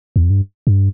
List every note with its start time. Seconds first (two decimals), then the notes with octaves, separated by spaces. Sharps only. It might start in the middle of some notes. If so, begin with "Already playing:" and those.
0.16 E2
0.23 F2
0.30 G2
0.67 G2